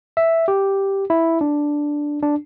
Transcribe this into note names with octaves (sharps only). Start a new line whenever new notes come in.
E5
G4
E4
D4
D4